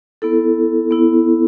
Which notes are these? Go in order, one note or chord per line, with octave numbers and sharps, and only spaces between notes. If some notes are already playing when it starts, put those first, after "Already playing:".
B3 E4 A4
B3 E4